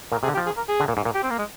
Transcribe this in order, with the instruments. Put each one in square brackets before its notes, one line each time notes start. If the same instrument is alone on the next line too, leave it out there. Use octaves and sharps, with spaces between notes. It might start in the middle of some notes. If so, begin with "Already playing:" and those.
[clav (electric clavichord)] A#2 [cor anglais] A#4
[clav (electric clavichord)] C3 [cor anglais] G#4
[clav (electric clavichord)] D3
[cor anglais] G4
[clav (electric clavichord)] F3
[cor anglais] G#4
A#4
G#4
[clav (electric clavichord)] D3
A#2
G#2
A#2
[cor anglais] G4
C4
A#3
G#3